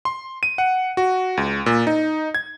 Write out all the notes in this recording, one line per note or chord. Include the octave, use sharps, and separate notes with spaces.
C6
D#7
F#5
F#4
C#2
A#2
D#4
G#6